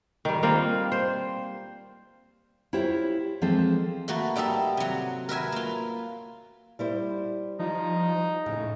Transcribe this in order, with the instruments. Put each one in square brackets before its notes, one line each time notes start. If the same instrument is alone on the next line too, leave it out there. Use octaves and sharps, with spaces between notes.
[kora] D#3 G3
G3 A#3 C4 F4
C5
[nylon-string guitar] E4 F4 G4 C5 C#5
E3 F3 G#3 C4 A4
[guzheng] A3 A#3 F#4 B4
G3 D#4 G4 A4 E5
C3 F#3
A#4 B4 E5 G#5
A#3 F4
[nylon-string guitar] G3 E4 C5
[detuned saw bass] F3 [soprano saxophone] D#4
[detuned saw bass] A2 [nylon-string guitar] C#3